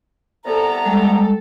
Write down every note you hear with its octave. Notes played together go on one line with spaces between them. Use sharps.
C2 B3 A4 A#5
G3 G#3 A4